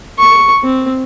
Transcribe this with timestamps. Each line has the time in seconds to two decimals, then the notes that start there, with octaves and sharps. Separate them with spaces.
0.18 C#6
0.63 C4